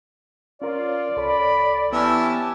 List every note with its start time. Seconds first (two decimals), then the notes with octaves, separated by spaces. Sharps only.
0.62 C#4 F4 A#4 C#5 D5
1.17 C2 A4 C#5 B5
1.93 E3 B3 C#4 E4 G4 G#5 A5